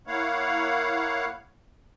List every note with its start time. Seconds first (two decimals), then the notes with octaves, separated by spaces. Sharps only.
0.07 A#3 E4 C#5 F5 F#5